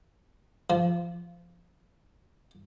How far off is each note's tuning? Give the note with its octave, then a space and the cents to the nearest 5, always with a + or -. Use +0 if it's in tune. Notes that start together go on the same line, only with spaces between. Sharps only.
F3 -15